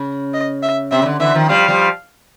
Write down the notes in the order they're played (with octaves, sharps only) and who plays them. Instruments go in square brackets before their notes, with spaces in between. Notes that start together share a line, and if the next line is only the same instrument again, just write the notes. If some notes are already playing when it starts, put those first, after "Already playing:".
Already playing: [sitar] C#3
[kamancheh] D#5
E5
[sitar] C3 [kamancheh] E5
[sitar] C#3
D3
[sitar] D3 E3 [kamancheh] E5
[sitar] D#3 F3
[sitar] F3 G3 [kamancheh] F5
[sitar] F3 G3